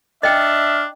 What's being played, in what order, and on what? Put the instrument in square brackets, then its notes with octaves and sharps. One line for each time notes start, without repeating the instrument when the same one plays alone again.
[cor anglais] D4 [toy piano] D#5 G5 [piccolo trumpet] E5 [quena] F6